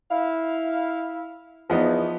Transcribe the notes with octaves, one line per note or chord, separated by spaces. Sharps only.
E4 F5
E2 F3 B3 D#4